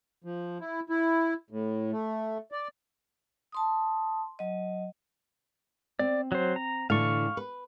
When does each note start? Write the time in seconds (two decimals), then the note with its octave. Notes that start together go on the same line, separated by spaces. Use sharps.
0.24 F3
0.61 E4
0.90 E4
1.51 A2
1.92 A3
2.52 D5
3.52 A5 C6 D#6
4.39 F#3 D#5
5.99 C4 D5
6.32 F#3 C5
6.56 A#5
6.90 A2 D3 E3 F5 C#6
7.37 B4